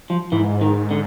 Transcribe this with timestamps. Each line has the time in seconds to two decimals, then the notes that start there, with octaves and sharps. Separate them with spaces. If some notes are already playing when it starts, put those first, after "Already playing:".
0.10 F3
0.32 G#2 E3
0.61 D#3
0.91 D3